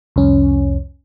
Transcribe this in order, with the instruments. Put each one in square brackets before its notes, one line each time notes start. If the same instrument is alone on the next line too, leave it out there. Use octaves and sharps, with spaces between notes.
[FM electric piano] C2 F2 C#4